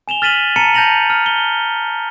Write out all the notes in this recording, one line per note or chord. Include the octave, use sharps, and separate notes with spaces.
G#5 E7 F7 G7
F6 A6 B6 D#7 E7 F#7
A5 A#5 A6 C#7 D#7 E7
A5 G6 A6 A#6 F7 F#7
F6
G7